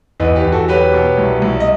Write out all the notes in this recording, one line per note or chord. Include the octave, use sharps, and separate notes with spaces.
E2 B4 D#5
G4 B4
E2
F#4 A4
F#3 G4 B4
B2
C2
C2
D#5